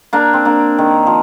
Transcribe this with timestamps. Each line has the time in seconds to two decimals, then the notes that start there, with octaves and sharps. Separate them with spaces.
0.13 A#3 D4
0.34 C4
0.45 A#3 D4
0.78 D#3
1.07 F3